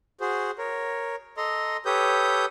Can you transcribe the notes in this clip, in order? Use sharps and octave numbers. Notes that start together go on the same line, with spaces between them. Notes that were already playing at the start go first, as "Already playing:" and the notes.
F#4 G#4 C5
A#4 C#5
A4 D#5 A#5 C6
G4 A4 B4 C#5 D#6 G6